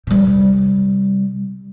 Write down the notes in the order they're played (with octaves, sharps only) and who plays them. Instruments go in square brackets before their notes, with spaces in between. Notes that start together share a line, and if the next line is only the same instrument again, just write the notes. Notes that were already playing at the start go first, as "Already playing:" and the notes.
[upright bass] C3 G3